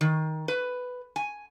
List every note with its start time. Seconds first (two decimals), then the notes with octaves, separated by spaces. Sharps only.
0.01 D#3
0.48 B4
1.16 G#5